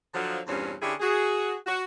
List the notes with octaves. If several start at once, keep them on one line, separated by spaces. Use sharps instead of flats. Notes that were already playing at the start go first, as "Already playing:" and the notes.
D3 F3 F#3
E2 G2 A#2 C4 C#4
D3 C#4 D4 E4 G4 G#4
F#4 G#4
F#4